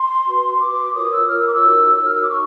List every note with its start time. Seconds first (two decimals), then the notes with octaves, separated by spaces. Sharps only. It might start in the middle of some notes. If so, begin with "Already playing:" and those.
Already playing: C6
0.25 F#4 B4
0.59 F#4 B4 D6
0.94 F4 A#4 C#5 D#6
1.11 E6
1.27 F4 A#4 C#5 F6
1.37 E6
1.45 D6
1.53 E6
1.62 D#4 F#4 A#4 C#5
1.96 D#4 F#4 A#4 C#5 E6
2.05 F6
2.14 E6
2.21 D6
2.30 D#4 C#6